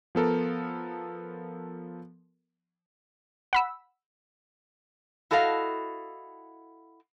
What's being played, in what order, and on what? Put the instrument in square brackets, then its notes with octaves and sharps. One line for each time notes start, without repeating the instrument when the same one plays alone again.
[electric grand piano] F3 B3 A4 A#4
[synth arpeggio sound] F#5 B5 E6
[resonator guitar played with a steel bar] E4 F#4 A4 D#5 F5